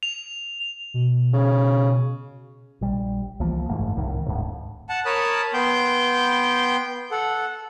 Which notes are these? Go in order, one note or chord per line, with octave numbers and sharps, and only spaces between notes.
F7
B2
C#3
A#1 G3
C2 E3 F3 A#3
F#1 G#2 A3
C2 A2 D#3
D1 G#2
F#5 A5
A#4 C#5 A5 B5 D#6
B3 G5 C6 G6
A4 F#5